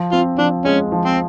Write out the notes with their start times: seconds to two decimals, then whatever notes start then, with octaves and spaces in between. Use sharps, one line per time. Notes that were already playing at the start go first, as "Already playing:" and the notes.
Already playing: F3
0.12 C4 F4
0.38 F3 D4
0.65 G#3 C#4
0.92 F3
1.05 C4